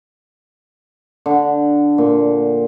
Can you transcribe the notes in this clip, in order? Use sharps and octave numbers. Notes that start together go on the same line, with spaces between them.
D3
A#2